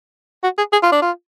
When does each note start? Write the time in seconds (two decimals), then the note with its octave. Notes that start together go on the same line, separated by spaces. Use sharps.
0.44 F#4
0.58 G#4
0.73 G#4
0.83 F4
0.92 D4
1.02 F4